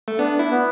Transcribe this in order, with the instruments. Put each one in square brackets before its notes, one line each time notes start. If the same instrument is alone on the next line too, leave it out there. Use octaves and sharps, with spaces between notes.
[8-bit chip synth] A3
[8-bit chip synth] B3 [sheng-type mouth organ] D4
[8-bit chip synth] E4
[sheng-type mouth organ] B3